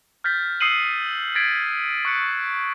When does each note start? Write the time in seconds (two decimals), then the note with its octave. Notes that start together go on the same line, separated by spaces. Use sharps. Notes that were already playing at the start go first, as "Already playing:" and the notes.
0.24 F6 G6 A6 B6
0.60 D#6 E6 C7 C#7 D#7 F#7
1.35 G#6 A6 B6 C7 D7
2.05 C#6 F#6 C#7